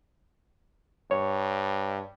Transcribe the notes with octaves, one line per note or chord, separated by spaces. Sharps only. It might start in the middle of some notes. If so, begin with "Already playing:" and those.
G2 C#5